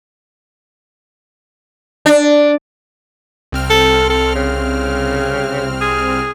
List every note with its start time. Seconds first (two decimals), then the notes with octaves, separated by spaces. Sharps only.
2.06 D4
3.52 C2 C4 F6
3.70 A4
4.10 A4
4.35 C#3
5.81 G#4